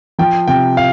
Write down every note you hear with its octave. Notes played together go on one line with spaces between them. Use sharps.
F3 G5
C3 G5
F5